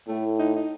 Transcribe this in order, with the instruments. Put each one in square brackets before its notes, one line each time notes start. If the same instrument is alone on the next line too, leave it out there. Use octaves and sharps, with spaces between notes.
[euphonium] A2 [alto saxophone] A3
[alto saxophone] D#4
D#4